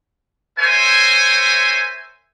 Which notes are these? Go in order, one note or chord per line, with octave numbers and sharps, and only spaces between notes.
A#4 C5 C#5 E5 G#5